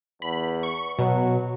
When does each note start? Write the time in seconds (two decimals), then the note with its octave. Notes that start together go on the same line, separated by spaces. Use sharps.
0.22 E2 B5
0.63 C#6
0.99 B2 F#3